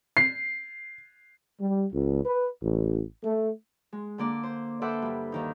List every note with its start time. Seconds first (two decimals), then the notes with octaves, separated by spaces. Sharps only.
0.17 C7
1.60 G3
1.93 C#2
2.26 B4
2.61 A1
3.24 A3
3.93 G#3
4.18 D3 A#3 D5
4.43 C5
4.82 A4 B4 C5 D5 E5 F#5
5.02 G2 G3
5.32 D#2 D#3 D#4